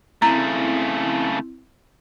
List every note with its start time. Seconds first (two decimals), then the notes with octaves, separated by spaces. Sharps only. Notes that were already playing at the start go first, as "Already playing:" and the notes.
0.22 C#3 A3 C4 E4 A#5